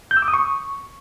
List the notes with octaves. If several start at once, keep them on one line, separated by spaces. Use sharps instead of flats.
G6
E6
D6
D#6
C#6